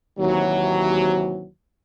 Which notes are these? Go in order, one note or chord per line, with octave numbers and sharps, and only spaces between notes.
D#2 C3 E3 F#3